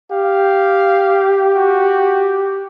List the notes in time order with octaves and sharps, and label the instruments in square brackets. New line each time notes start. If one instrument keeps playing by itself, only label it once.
[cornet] G4 [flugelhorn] F5
[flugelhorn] F#4